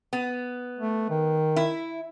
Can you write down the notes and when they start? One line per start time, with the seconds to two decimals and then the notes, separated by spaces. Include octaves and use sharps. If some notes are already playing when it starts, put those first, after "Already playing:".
0.13 B3
0.79 A3
1.10 D#3
1.56 E4